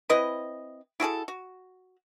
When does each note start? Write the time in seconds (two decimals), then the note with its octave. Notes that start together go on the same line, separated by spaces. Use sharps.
0.09 C4 E4 B4 D#5
1.00 E4 F#4 G#4 A4
1.28 F#4